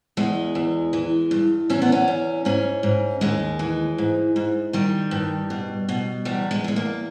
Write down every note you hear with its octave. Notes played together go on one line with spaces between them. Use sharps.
E2 G#3
E2
E3
G2
E2 C#4
B3
C#4
E2
G#2 C#4
G#2
D#2 G#3
E3
G#2
G#2
D#3 G3
G2
B2
B2
E2 G3
G#3
E2 G#3
A#3